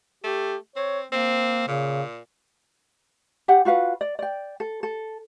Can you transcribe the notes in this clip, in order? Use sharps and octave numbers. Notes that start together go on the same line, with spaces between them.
A3 G4
C4 C#5
A#3 C4
A#2 C#3
G4 C#5 F#5 G5
F4 F#4 B4 F5
D5
D5 G5
A4
A4